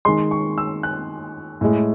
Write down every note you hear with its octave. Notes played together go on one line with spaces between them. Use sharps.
D#3 G#3 C6
C#6
E6
F#6
A2 G#3